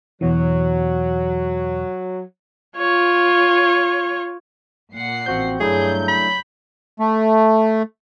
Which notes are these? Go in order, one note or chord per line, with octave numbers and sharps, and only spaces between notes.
E2 B2 E3 F#3
F4 C#5
A#2 F#5 C7
A1 F3 C4 F#4 G6
G2 C#3 F#3 A3 D4 E4 G#4 G6
B5
A3